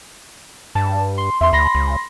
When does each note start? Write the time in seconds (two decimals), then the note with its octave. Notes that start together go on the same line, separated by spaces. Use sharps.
0.75 G2 A5
1.18 C6
1.41 E2 E5 C6
1.53 D2 B5 C6 A#6
1.75 C#2